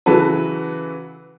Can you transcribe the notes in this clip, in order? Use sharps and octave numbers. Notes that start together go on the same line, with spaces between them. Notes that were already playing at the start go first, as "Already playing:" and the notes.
C#3 E3 F#3 F#4 A4 B4